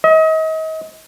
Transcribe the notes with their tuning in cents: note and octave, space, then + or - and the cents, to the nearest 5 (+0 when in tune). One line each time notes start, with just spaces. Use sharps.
D#5 +35